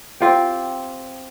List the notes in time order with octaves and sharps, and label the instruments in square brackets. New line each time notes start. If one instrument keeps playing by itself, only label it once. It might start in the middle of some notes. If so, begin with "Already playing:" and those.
[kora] C4 F4 G4